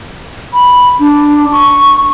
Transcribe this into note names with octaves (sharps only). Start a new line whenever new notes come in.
B5
D4
C#6